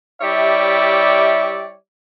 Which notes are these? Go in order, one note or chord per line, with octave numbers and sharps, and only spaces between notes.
G3 E4 G4 C#5 D5 E5